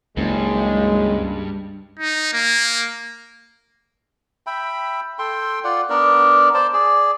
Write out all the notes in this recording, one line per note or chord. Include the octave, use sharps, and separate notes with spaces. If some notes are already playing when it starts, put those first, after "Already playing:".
F#1 C#2 G2 G#3
D#4
A#3
E5 G5 B5
A4 G5 C6
F4 D5 F#5
B3 D4 A#4 D5
C5 D5 A5
G#4 D5